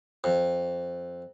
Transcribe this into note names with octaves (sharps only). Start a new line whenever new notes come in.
F2